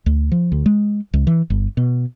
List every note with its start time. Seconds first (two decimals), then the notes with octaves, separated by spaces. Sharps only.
0.06 D2
0.32 F3
0.52 D2
0.66 G#3
1.14 C#2
1.27 E3
1.50 G1
1.77 B2